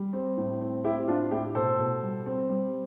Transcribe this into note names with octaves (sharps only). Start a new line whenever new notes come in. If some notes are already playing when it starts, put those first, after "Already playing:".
Already playing: G3
C4
A2
C4
C4 E4 G4
A2 D4 F4
A2 E4 G4
B2 A4 C5
B2
G3
C4
G3